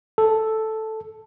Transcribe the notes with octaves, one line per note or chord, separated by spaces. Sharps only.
A4